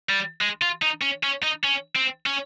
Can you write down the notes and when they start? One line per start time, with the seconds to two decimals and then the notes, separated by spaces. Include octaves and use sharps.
0.09 G3
0.41 G#3
0.62 F4
0.83 D#4
1.02 C#4
1.24 C#4
1.44 D#4
1.64 C#4
1.96 C4
2.26 C#4